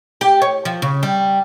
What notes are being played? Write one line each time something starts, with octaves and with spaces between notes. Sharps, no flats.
G4
C#5
F3
C#3
G3